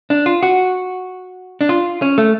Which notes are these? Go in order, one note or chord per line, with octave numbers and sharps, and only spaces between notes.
D4
F4
F#4
D4
F4
C#4
A3